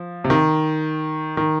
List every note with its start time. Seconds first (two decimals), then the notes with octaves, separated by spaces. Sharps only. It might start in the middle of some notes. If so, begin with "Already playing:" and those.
Already playing: F3
0.24 C3
0.30 D#3
1.37 D#3